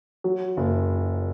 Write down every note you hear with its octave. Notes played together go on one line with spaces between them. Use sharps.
F#3
F#1